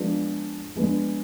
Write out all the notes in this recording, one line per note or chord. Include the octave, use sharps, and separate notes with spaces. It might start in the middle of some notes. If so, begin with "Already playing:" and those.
Already playing: F3 G#3 B3 D4
F3 G#3 B3 D4